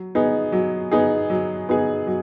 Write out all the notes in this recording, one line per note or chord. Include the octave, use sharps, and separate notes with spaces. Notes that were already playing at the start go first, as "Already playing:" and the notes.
Already playing: F#3
B3 D#4 G#4
F#3
B3 D#4 G#4
F#3
B3 D#4 G#4
F#3